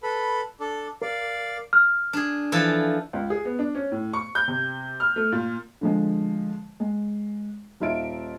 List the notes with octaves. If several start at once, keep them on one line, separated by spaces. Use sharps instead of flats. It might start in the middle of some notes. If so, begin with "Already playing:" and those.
A4 B4 B5
D4 A4
A#4 D5 F5
F6
D4 G#4
E3 F3 A4
C#2
G#4
B3
D4
C#4
A2
C#6
G6
C3
F6
A3
A#2
D3 F3 G#3
G#3
D#1 D#4 F4 E5 D7